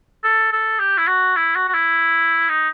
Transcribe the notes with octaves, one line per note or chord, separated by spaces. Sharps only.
A4
A4
G4
E4
F#4
E4
F#4
F#4
E4
D#4